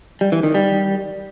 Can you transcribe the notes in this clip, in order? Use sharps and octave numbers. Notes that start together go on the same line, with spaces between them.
G3
E3
D#3
G3